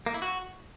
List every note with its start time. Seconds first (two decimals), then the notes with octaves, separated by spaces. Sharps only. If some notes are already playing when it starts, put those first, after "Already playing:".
0.06 A#3
0.14 E4
0.22 F#4